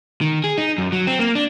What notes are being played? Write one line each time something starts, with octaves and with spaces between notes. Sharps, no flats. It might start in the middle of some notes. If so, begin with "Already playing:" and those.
D#3
G#4
D#4
F#2
F#3
C4
A#3
D4